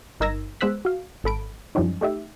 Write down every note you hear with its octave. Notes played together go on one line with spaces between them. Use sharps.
G1 D#4 A#4 E6 G#6 A#6
G#3 B3 C5 E6 F#6 B6
F#4 F5
G#1 A4 B5 D7
F#2 E3 F3 G3 C#4 D#4
A3 D#4 G4 E5